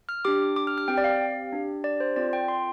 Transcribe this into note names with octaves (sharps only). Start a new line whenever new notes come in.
F6
D4 G4 D6
D6
F6
F6
C4 G4 G5
D5
F5
D4 G4
D5
C5
C4 F4 A4 D5
G5
C6